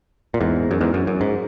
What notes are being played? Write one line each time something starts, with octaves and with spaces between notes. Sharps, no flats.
A#2
E2 G#2
F#2
E2 G#2
F#2
F#2
G#2